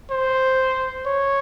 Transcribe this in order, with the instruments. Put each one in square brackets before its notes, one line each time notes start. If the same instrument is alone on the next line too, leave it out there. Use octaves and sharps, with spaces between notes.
[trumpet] C5
C#5